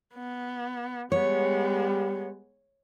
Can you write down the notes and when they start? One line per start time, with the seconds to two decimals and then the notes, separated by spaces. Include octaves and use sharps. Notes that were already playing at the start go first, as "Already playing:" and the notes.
0.14 B3
1.12 G3 G#3 B3 C#5